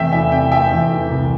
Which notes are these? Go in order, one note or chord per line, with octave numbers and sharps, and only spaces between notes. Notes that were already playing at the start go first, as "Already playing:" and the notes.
Already playing: E2 C3 A3 E5 G5
E3 E5 G5
C3 E5 G5
A3 E5 G5
E2
E3
C2